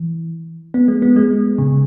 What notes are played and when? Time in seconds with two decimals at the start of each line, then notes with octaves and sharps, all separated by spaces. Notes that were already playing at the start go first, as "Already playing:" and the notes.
Already playing: E3
0.74 B3
0.88 G#3
1.02 B3
1.16 G#3
1.58 C#3